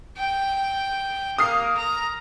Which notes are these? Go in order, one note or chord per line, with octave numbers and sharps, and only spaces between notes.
G5
A#3 D#6 F6 C7
A#5